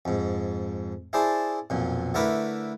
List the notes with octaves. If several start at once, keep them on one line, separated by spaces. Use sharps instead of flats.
F2 G#2
E4 G#4 C5 D5 A5
B1 F2 A#2
D3 A3 E4 A#4 B4 D6